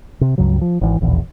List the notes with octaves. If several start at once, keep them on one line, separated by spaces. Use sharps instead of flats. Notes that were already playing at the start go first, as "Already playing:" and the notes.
C3
C#2 G2 C#3 F#3
F3
G#1 E3
D#1 A#1 E2 B2